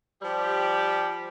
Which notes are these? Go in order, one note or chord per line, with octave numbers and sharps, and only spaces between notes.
F3 G3 G4